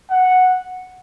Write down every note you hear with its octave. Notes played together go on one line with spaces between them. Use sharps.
F#5